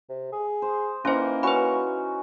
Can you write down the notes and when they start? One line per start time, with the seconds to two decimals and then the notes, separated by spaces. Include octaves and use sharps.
0.09 C3
0.33 G#4
0.62 C5
1.05 E3 A#3 C#4 D#4 C5 C6
1.43 C#4 F#4 B4 B5 C#6